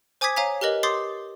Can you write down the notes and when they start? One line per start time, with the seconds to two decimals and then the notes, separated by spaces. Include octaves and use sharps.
0.21 C5 G#5 D6 D#6 G#6 B6
0.36 C#5 F5 G#5 A#5 B6
0.61 G4 A#4 B4 D#5 F#7
0.83 C6 D6 D#6 G6 A6 C7